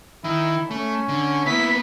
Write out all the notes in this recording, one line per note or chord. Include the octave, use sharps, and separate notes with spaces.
D#3 E4
A3 C#4
D3
A#3 B3 E4 B6